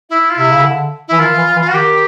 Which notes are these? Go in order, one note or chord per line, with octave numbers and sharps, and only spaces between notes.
E4
F4
C3 E4
C#3
D3
E3 E4
D#3 F4
E3
E3
F4
F#4
D#3 G4